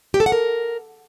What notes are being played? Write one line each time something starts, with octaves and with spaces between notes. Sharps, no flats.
G4
A4
F#5
A#4